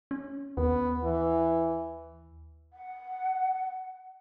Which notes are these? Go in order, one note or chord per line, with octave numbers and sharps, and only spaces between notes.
C#4
D#2 B3
E3
F#5